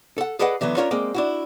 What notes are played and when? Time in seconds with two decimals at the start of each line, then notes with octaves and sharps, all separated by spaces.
0.18 A4 F#5
0.39 G#4 A4 B4 D5 D#5 F#5
0.61 D3 E3 F#3 B3
0.77 C#4 D4 F4 A#4 C#5
0.91 G#3 A#3 C4 D5
1.14 D4 E4 F#4